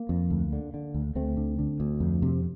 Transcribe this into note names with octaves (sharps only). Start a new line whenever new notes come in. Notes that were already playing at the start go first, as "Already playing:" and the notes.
Already playing: A#3
F2
D2
D3
D3
D2
D2 A3 C4
D3
D3
D2
F2
C3